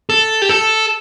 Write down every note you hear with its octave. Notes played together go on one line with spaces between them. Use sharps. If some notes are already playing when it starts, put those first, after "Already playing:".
A4
G4
A4